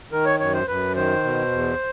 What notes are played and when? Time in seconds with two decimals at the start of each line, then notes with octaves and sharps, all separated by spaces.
0.12 D#3 A#4
0.26 C#5
0.40 F#2 C#5
0.54 C5
0.67 F#2 B4
0.95 D#3 C5
1.24 B2
1.52 E2